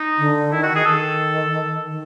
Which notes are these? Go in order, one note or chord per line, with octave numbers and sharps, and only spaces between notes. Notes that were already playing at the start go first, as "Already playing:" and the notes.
Already playing: D#4
D3
D#3 E4
F#4
G#4
D#3 A4
D#3